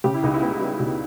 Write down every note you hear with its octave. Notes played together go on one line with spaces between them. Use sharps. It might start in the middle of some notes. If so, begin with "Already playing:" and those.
C#3 G4
E4
C#2 D#4
E4
B3
G3
C#3